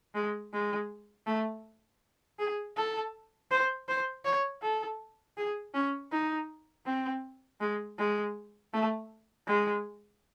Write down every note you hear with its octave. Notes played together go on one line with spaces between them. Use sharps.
G#3
G#3
A3
G#4
A4
C5
C5
C#5
A4
G#4
C#4
D#4
C4
G#3
G#3
A3
G#3